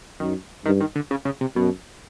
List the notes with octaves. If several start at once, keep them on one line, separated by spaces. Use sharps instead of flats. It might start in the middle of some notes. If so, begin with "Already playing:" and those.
F#2 D#3
G2 D#3
D#3
D3
C#3
C#3
C3
F#2 B2